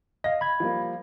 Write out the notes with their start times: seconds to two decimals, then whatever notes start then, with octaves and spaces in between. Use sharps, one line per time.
0.24 D#5 F5 A#6
0.41 B5 G#6
0.60 F3 G3 A#3